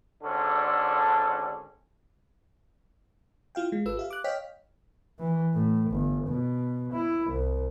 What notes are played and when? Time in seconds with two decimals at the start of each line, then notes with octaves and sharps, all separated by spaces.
0.23 G#1 D3 C#4 D4 A4
3.55 E4 F4 F5 G5
3.72 G#3
3.85 G#1 F4 A4 B4 E6
3.97 G4 E5 F5
4.11 D6 F#6
4.24 C#5 D#5 F5 G5 F6 B6
5.19 E3
5.55 A2
5.91 G1
6.28 B2
6.92 E4
7.31 C2